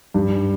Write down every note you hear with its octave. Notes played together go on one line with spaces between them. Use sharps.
G2